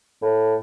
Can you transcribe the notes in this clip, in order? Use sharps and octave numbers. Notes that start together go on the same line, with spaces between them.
A2